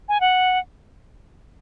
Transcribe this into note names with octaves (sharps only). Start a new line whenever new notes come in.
G#5
F#5